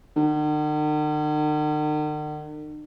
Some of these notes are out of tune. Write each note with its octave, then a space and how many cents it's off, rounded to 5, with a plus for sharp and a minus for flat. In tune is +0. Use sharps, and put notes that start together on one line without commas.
D#3 -45